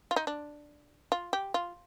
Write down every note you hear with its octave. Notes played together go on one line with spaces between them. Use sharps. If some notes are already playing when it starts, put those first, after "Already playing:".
F4
D#4
D4
F4
G4
F4